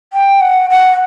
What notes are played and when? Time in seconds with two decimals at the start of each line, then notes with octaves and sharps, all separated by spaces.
0.13 G5
0.41 F#5
0.70 F#5